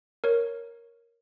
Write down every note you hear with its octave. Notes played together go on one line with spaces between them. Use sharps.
A#4 C#5